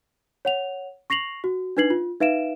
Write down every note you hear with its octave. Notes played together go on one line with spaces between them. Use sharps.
C#5 F#5 F7
C#6 A#6 C7 F7 F#7
F#4
D4 D#4 B4 G#6 C7 F#7
F4
D#4 B4 E5 F5 D7 E7